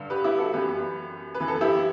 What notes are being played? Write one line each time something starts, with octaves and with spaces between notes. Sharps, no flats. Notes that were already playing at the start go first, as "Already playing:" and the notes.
Already playing: G2 D3
G4 B4
E4 G4
F#4 A4
F#2 E3 G4 B4
B4
F#2 E3
A4
E4 G4